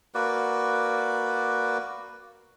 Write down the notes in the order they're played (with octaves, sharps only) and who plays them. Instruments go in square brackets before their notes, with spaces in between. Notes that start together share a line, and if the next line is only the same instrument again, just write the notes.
[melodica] A#3 F#4 B4 D5